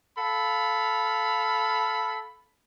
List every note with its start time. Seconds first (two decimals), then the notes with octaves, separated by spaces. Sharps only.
0.17 A4 F5 B5